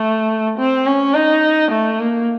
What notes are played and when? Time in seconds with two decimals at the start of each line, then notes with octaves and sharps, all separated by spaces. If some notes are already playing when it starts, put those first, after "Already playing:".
Already playing: A3
0.58 C4
0.87 C#4
1.15 D#4
1.72 A3
1.99 A#3